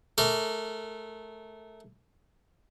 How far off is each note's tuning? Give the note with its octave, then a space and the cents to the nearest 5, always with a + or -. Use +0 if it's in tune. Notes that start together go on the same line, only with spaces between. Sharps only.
A3 -20 A#4 -25 D6 -40